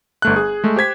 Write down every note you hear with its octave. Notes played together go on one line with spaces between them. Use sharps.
G1 A3 F#6
G#4
G#3 A3
G4 C5 G#6 B6